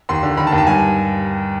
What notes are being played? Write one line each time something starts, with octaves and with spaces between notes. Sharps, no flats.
D#2 C6
D3
D#3 B5
A5
D#2
A5
G2 G#5